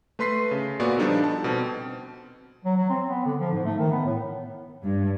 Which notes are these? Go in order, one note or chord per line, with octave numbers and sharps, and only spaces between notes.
A3 B4 C6 B6 C7
C#3
A#2 B3 F#4 D5
F3 G3 D4 D#4 A4
A5
B2 C4
F#3
F#3
C4
B3
D3
F3
G#2
A3
D#3
B3
A2
G2